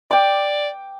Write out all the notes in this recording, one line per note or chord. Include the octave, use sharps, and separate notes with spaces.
D5 G5 D6